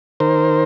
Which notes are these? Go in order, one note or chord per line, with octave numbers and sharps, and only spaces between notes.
D#3 A#4 C5